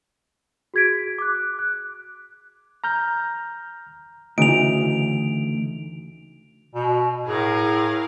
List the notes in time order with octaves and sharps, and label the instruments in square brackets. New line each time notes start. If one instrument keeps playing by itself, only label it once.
[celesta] F#4 G#4 G#6 B6 D7
D6 F#6
F#6
[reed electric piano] A#5 F6 G6
[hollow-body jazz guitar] D2 [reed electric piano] C#3 E3 D#4 [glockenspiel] D7 F7
[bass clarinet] B2
[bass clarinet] A2 [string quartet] G#4 A#4 F5